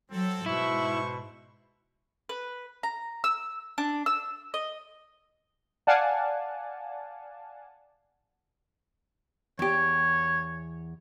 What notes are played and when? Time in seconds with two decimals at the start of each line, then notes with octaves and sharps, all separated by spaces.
0.11 F#3 C4 A4
0.46 G#2 B2 E4 C5 C#6
2.29 B4
2.83 A#5
3.24 E6
3.78 D4
4.06 E6
4.54 D#5
5.87 D5 F5 F#5 G#5 A5
9.59 E2 G4 C#5